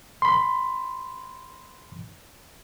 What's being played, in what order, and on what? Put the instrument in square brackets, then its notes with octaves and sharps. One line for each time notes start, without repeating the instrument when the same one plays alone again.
[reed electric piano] B5 C6